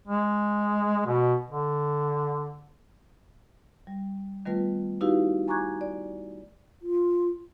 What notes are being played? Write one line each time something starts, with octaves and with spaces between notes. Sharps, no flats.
G#3
B2
D3
G3
D#3 G3 A3 B3 F4 B4
D#4 E4 F#4 G4 B4 F5
G#5 A#5 C#6 D6 F#6 G#6
D5
F4